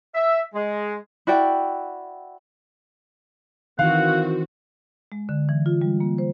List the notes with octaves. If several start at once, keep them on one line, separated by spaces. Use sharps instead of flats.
E5
G#3
E4 F#4 D5 G5
D#3 E3 C4 F#4 F5 F#5
G#3
D3
E3
F4
G3
A#3
C5